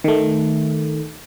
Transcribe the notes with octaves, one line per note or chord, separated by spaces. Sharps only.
D#3 A3